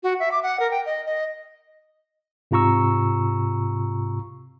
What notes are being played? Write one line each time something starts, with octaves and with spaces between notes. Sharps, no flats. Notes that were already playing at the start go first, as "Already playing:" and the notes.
F#4
E5
D6
F#5
A#4
G5
D#5
D#5
G#2 C3 F4 A#5 C#6 E6